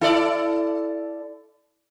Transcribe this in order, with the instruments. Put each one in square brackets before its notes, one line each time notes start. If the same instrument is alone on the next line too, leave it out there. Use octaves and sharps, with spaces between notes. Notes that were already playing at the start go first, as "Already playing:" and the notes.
[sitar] E4 A4 D5